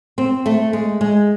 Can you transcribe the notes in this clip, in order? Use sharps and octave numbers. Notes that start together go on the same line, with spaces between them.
C4
A3
G#3
G#3